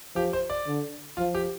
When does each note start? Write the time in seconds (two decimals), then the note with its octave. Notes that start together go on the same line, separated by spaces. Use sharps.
0.15 F3 G4
0.33 C5
0.50 D5
0.67 D3
1.17 F3 F4
1.35 G4